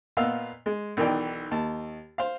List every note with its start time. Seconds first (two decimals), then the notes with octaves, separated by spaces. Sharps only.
0.17 A#2 B3 D#5 F5 F#5 E6
0.66 G#3
0.97 B1 D#3 E3 D5 G5
1.51 D#2 A5
2.18 C5 F5